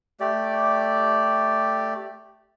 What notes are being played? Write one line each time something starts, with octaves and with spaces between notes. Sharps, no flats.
A3 G4 D5